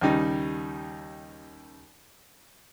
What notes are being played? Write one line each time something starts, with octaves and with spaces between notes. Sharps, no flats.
D#2 C#3 G3 D#4